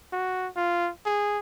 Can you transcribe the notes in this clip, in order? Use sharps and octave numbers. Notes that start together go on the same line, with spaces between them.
F#4
F4
G#4